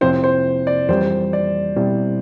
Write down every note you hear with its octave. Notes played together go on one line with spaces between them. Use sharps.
F2 C3 F3 C4 E4 C5
C5
D5
F2 E3 G3 C5
D5
B2 G3 C4 E4